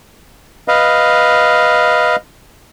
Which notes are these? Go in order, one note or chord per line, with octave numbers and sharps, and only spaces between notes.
B4 D#5 F5